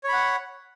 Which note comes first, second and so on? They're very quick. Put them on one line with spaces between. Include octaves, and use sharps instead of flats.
C#5 B5 F#5